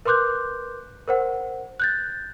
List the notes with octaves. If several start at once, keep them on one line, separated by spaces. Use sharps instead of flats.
A#4 B4 C6 D6 F#6 G6
A#4 C5 F#5
F#6 G6 A6